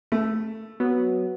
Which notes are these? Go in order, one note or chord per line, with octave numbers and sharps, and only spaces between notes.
A3
F#3 B3